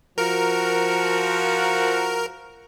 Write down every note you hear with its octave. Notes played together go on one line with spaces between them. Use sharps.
F3 F#4 A#4